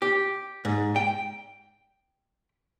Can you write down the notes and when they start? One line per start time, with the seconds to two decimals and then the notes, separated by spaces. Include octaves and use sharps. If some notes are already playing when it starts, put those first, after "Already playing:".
0.02 G4
0.65 G#2
0.96 G5